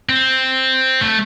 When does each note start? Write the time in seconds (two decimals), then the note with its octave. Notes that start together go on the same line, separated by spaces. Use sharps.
0.09 C4
1.01 A3